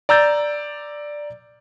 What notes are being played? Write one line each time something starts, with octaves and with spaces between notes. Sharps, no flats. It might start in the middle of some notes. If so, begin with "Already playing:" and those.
D5 A#5 E6 G6 A6